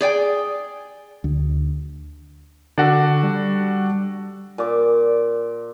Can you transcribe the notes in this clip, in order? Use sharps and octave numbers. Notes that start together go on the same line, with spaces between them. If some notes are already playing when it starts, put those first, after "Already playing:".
G#4 D5 G5 G#5
D2
D3 D4 F#4 A4
G3
A#2 D6